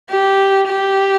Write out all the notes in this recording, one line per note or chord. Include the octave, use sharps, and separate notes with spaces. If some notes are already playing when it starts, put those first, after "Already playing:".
G4
G4